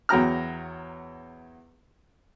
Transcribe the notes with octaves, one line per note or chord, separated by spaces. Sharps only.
E2 F#3 G5 A#5 F6